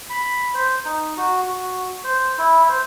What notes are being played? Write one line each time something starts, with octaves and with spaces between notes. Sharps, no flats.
B5
C5
D#4
F#4
F#4
C5
E4
C5